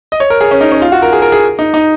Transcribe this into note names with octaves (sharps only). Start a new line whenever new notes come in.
D#5
C#5
A#4
G#4
C#4
D#4
C#4
F4
F#4
A#4
G#4
A#4
G#4
D#4
D#4